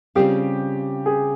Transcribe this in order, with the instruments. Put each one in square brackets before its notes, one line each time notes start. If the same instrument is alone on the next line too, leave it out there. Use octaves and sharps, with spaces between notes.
[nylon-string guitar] C#3 G3 C4 F4 [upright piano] G4
[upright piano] G#4